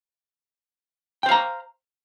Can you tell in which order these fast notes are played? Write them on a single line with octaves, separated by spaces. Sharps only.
G5 C5 F5 A#5